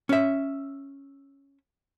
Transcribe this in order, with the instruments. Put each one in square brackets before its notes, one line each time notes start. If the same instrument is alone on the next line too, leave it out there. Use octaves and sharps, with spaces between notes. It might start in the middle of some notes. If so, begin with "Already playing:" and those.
[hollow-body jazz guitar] C#4 E5